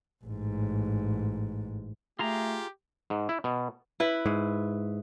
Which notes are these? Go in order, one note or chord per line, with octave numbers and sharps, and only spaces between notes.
A1 G#2
A3 F4 G4 G#4 A#5
G#2
E4
B2
E4 B4
G#2